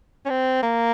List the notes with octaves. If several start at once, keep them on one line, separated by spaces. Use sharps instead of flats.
C#4
C4
A#3